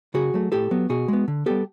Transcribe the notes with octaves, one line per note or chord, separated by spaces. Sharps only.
C#3 F#4 G#4
F#3 A3
A2 G4 A4
F#3 B3
B2 F#4 G#4
G#3 B3
D3
G3 B3 G4 A4